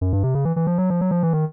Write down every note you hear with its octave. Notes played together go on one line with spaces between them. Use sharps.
F#2
G2
C3
C#3
E3
E3
F3
F#3
F3
F#3
F3
E3
D#3